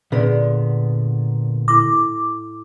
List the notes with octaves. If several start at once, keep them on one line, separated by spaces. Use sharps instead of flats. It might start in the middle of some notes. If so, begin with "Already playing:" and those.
A#2 D3 B3 G#4 D5
A2 E4 D6 A#6